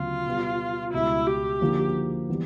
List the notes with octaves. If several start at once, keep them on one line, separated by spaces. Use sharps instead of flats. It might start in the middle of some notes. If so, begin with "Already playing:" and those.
Already playing: D2 C#3 F#3 B3 F4
B2 G3 B3
C#2 B2 G3 E4
G4
D3 F3 A#3 D#4 F#4
E3 G3 B3